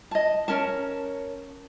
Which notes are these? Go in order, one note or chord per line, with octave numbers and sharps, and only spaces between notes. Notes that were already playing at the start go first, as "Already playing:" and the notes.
D#5 A5
C#4 A#4 A5